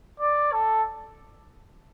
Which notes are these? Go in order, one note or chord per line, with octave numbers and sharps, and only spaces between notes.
D5
A4